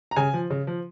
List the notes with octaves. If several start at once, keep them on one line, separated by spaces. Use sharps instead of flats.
A#5
C#3 G#5
F3
C#3
F3